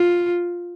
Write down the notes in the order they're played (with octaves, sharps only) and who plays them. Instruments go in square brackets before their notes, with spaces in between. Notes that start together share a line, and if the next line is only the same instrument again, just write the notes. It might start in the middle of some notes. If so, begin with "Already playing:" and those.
Already playing: [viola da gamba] F4